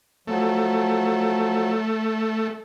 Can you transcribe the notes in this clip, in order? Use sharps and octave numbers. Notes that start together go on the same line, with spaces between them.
F3 F#3 A3